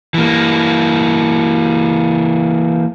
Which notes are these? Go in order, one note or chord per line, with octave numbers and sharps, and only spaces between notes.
E3 A#3